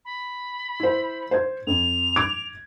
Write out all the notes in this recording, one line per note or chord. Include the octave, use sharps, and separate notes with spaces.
B5
E4 C5
C5 G#6
F2 F7
D6 G#6 D7